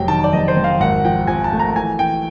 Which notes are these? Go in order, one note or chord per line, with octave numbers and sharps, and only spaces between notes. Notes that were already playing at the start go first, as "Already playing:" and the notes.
Already playing: F1 F#3 G5
D#3 A5
D5
F1 D#5
C5
F1
F5
G#1 F#5
F3 G5
F3 G#5
A5
A3
A#5
E3 G#5
E3 G5